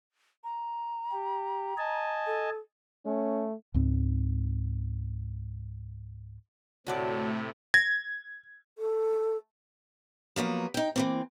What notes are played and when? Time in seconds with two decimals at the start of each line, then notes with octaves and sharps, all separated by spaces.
0.44 A#5
1.12 G4
1.78 D#5 G#5 A5
2.27 A4
3.06 A3 C#4
3.74 C#2 G#2 C4
6.87 D2 A2 C3 A3 F#4 C#5 D5 A5
7.74 G#6 A#6
8.78 A4
10.36 F3 F#3 A#3 B3
10.74 D#4 G5
10.96 E3 A#3 C4